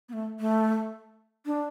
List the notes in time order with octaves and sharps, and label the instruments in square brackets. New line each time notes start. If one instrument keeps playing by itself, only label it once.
[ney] B3
A3
A3
D4